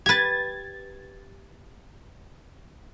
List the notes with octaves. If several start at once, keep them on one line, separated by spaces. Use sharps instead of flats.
G4 B4 G#6 A6